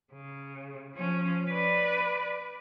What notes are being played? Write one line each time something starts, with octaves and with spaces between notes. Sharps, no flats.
C#3
F3 C#4
B4 D5